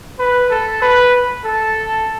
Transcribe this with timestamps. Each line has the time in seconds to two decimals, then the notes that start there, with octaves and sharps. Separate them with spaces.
0.19 B4
0.50 A4
0.82 B4
1.45 A4